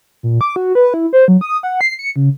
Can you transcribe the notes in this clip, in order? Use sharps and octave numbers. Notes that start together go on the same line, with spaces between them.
A#2
D6
F#4
B4
E4
C5
F#3
D#6
F#5
C7
C#7
C#3